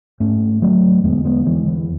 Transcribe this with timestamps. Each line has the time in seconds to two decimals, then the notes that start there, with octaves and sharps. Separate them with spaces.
0.20 G#2 A3 C#4
0.62 F#3 A3
1.03 E2 D3 G#3 B3
1.25 G#3 B3
1.46 E3 G#3
1.68 E3